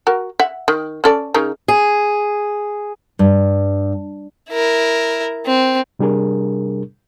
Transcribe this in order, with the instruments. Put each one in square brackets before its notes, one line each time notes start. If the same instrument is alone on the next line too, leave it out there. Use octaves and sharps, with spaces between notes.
[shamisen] F#4 A#4
E5 F#5
D#3
C#4 A4 D5
C#3 D#4 A#4
[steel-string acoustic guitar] G#4
[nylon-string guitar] G2
[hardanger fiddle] E4 A#4
C4
[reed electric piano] C3 G3 D4 G#4 A#4